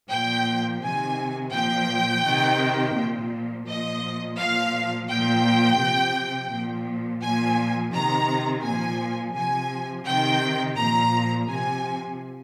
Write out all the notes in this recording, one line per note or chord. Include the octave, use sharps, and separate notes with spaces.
A#2 F3 G5
C3 D#3 G#5
A#2 F3 G5
C3 D#3
A#2 F3
A#2 F3 D#5
A#2 F3 F5
A#2 F3 G5
C3 F3
A#2 F3
A#2 F3 G#5
C3 D#3 A#5
A#2 F3 G#5
C3 F3 G#5
C3 D#3 G5
A#2 F3 A#5
C3 F3 G#5